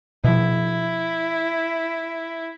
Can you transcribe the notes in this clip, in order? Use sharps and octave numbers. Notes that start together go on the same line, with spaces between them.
B2 F3 E4